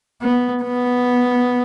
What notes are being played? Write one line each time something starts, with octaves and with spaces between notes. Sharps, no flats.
B3
B3